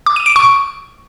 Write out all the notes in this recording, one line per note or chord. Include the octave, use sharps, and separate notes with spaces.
D6
D#7
D7
C#6